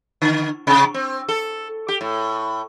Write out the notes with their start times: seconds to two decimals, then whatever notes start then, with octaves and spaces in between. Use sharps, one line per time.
0.22 D3
0.67 C3
0.94 C4
1.28 A4
1.88 G4
2.01 A2